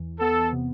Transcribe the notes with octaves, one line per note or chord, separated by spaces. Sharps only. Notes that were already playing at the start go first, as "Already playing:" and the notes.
Already playing: E2 E3
B3 A4
C3